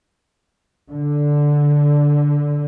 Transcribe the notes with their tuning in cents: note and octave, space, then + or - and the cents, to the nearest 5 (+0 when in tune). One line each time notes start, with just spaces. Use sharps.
D3 -5